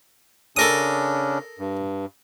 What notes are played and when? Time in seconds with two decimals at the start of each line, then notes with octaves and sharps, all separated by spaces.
0.57 C#3 C#4 D4 A4 A#4 D#6
1.59 G2